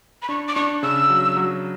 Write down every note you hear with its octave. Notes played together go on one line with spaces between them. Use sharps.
B5
D4 C#6
D6
D4 C#6
C#3 E6
F#3
F#3